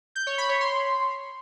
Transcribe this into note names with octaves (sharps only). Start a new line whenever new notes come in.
G6
C#5
B5
C#5
C6